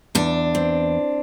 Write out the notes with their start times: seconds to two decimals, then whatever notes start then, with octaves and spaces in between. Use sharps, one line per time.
0.15 E2 D4
0.55 C4